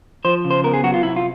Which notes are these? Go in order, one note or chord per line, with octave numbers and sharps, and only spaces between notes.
F3 C5
C#3
C5
B3 A#4
G#4
F#3 F#4
F4
C3 E4
F4